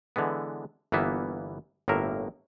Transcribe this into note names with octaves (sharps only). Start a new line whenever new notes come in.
D3 E3 G#3 B3
G1 E3 A#3 B3 E5
G1 A2 A#3 A#4 E5